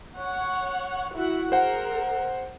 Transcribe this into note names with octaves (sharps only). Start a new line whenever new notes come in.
C#5 F#5
E4 F#4 F#5
G#4 A#4 C5 F#5